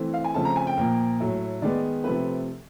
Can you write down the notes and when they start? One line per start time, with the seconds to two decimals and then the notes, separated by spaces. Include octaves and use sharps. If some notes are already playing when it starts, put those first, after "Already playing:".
Already playing: E3 A3 C4
0.14 F5
0.24 G#5
0.34 C#3 F3 A3 C4 A5
0.45 A#5
0.56 G#5
0.67 G5
0.78 A#2 F3 A#3
1.20 A2 F#3 A3
1.62 D#3 G#3 B3 D5
2.04 C3 F3 A3 C4 B4